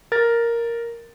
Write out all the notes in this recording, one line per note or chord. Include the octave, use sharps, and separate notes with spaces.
A#4 A6